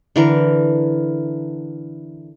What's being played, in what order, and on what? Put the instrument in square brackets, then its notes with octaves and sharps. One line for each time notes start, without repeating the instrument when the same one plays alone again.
[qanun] D3 E3 A#4